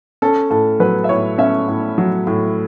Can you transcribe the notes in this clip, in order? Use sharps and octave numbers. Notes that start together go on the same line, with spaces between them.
C#4 A4
A2 A4
F#3 B4
E5
A2 C#5
C#4 E5
A2
F#3
A2